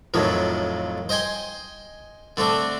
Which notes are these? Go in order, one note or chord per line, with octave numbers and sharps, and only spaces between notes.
F2 A2 D#3 F3 F#3
C5 D#5 G5 G#5 C6
D3 A3 C4 D4